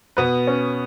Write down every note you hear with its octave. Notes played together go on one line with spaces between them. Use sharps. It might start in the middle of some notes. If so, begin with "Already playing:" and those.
B2 B3 B4
C#4